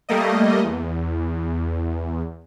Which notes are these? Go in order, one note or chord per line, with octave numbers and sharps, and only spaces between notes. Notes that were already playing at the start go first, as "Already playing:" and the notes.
G3 A3 A#3 D#5
E2